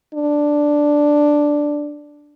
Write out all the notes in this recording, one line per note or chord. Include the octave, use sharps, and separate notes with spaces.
D4